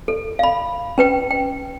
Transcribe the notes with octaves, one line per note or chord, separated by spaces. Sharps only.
A4
F5 B5
C#4 B4 G5
G5